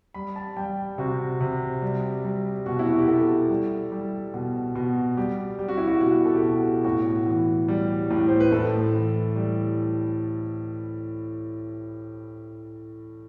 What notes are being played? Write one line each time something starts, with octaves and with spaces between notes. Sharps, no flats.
G3 B5
A5
G3 G5
C3 F#4
C3
G3
G3
B2 F#4
E4
F#4
G4
B2 A4
G3
G3
B2
B2
G3 G4
G3 G4
F#4
E4
F#4
B2 F#4
A4
G4
B2 F#4
A2 F#4
E3
G3
A2
C5
B4
A2 A4
E3
G3